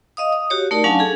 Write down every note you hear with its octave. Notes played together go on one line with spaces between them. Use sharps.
D#5 F5 D#6
D#6
F#4 G4 C#5
A3 D#4 A#4 D5
F#3 C#4 D4 F5 G#5 A5
G#4 A4